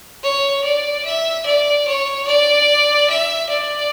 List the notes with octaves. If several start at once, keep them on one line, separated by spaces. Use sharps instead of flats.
C#5
D5
E5
D5
C#5
D5
E5
D5